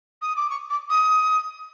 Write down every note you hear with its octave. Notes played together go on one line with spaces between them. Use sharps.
D#6
D6
C#6
D6
D#6